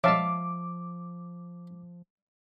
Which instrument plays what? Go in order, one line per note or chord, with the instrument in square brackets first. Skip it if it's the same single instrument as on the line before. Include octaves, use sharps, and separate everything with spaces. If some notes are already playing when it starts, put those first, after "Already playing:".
[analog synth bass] F3 [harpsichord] G#3 C#4 [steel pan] E5 F5 A5 [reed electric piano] D6